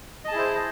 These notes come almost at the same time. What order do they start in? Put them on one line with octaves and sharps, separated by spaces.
D#5 A5 G#4 E4 C5